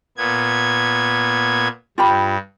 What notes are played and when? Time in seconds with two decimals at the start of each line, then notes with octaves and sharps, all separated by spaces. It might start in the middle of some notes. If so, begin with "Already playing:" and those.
0.17 A#2 B3 G#6
1.98 G2 F4 G4 B5